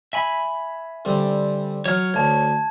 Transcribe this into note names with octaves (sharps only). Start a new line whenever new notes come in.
E5 G#5 B5
D3 G3 C4
F#3 C#5 F6
D2 A5 G#6